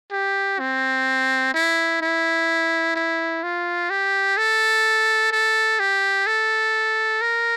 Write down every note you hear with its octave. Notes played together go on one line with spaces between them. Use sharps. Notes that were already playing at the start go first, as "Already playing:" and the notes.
G4
C4
E4
E4
E4
F4
G4
A4
A4
G4
A4
A#4